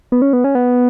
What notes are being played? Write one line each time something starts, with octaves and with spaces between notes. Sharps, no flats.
B3
C#4
B3
C#4
B3